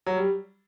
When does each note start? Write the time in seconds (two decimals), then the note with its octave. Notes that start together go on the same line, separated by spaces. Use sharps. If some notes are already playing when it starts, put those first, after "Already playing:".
0.06 F#3
0.17 G3